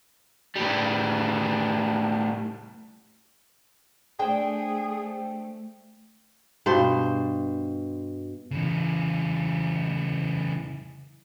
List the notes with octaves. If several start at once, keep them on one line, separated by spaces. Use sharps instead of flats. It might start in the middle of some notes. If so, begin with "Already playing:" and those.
A2 G3
A3 D4 G#4 C5 G5
G2 B2 C5
C#3 E3